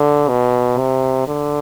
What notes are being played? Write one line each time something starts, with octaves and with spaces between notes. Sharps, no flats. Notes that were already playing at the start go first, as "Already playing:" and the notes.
Already playing: D3
B2
C3
D3